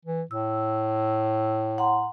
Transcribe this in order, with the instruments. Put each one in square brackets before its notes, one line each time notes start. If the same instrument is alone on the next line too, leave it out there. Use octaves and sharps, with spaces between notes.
[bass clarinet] E3
[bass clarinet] A2 [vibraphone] E6
[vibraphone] F#5 A#5 C6